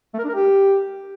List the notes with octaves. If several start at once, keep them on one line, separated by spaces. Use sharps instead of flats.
A3
A#4
D4
A#4
G4